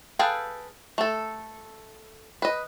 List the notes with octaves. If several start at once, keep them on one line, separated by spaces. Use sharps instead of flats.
G#4 A4 B4 F5 G5
A3 A4
B4 D#5